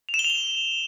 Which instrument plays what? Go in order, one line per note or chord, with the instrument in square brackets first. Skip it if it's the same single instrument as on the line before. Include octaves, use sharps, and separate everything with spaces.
[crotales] F7
E7
G7
F7
G7